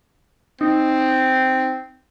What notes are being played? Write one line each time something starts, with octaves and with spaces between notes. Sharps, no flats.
C4 D#4